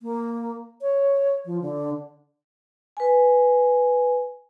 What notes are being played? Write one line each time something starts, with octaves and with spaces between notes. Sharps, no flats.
A#3
C#5
F3
D3
B4 G#5